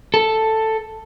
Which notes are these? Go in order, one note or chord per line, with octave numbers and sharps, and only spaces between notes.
A4